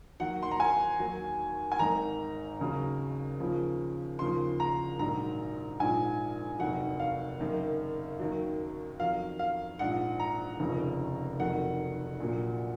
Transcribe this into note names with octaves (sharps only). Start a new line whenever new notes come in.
D#2 D#3 F#3 F#5
C6
A#5
G#5
D#2 D#3 F#3
G#5
G#1 G#2 D#3 A#5
D#2 C#3 F#3
D#2 C#3 F3
D#2 C#3 F3 C6
A#5
A#1 G#2 D#3 F#3 A#5
A#1 G#2 F3 G#5
F1 D#2 D#3 F#3 F#5
F5
F#1 F#2 D#3
D#2 D#3 F#3
F2 D#3 F#3 F5
F5
A#1 G#2 F3 F#5
A#5
F1 D#2 C#3 F3
F1 F2 D#3 F#3 F#5
A#1 A#2 F#3